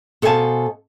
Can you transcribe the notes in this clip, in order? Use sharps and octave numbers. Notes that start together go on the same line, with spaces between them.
B2 A4 C5 F5 G#5 A5